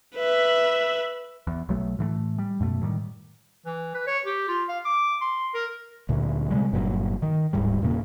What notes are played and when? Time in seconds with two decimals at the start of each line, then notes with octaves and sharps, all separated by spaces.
0.16 B4 E5
1.47 E2
1.69 B1 F#3 A3
1.99 A2 E3 F#3 A3
2.38 G3
2.60 F#2 B2 A3
2.81 A2 D#3 F#3 G3
3.66 E3
3.95 B4
4.07 C#5
4.26 G4
4.49 F4
4.69 F5
4.85 D6
5.21 C6
5.54 A#4
6.09 D2 A#2
6.50 C3 G3 G#3
6.72 G1 G2 A#2 F#3
7.22 D#3
7.53 D1 G#2 G3
7.82 E2 A#2 C#3 A#3